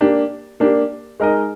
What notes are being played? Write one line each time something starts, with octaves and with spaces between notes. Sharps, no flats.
A#3 D4 G4
A#3 D4 G4
G#3 D#4 A#4 D#5